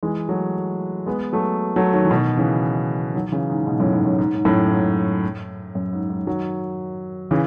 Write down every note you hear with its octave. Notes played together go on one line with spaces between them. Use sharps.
E3 G#3
F#3 A3
G#3 B3
F#3 A3
F#3 A3
D#3 F#3
E3
B2 D#3
C#3 E3
D#3 F#3
C#3 E3
G#2
G#2 B2
F#2 A2
G#2
F#2
G#2
G#2
F#2 A2
G#2
F#2
G#2
G#2
D#3 F#3
C#3 E3